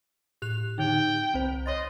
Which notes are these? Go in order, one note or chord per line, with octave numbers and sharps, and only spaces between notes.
A2 G4 F#6 F7
D3 D#4 G5
C2 C4 C5
C#5 D#5 C6 A6